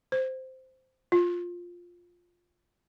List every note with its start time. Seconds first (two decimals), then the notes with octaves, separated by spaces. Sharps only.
0.12 C5
1.12 F4